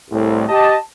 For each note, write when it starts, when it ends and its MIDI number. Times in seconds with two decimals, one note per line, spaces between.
0.11 0.46 36
0.11 0.46 45
0.49 0.77 67
0.49 0.77 75
0.49 0.77 81